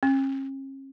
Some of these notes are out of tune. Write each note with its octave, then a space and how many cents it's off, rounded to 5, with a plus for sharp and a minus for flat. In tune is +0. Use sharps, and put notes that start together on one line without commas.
C#4 -40